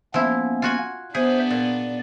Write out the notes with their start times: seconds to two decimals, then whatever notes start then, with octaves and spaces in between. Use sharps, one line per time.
0.14 F3 A#3 B3 C#4 E4
0.62 F4 F#4 G#5
1.15 B3 D4 G#4 C5 E5
1.50 A#2 D5